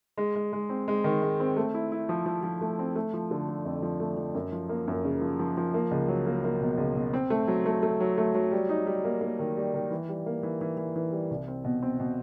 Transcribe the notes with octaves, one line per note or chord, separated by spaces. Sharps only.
G#3
G#3
G#3
C4
G#3
D#3
G#3
C4
A3
E4
E4
F3
F3
F3
A3
C4
A3
F3
D3
F3
F2
F3
A3
F3
F#2
F3
A#3
F#2
C#3
F3
F3
F3
A#3
C#2
F#3
A#3
A#3
B2
C#2
B2
C4
A3
F#3
A3
A3
F#3
A3
F#3
G3
D#4
G3
A#3
A#3
D#3
G3
D#3
E3
G3
A#3
E3
E3
E3
E3
G3
C2
C4
B2
C4
B2